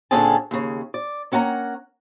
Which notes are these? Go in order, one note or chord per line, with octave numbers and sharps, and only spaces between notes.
A#2 D3 C4 C#4 G#4 A5
D#2 C#3
D5
A#3 C#4 F#5 A5 A#5